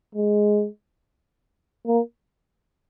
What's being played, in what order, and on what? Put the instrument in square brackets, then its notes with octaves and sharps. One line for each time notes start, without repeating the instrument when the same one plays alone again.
[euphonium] G#3
A#3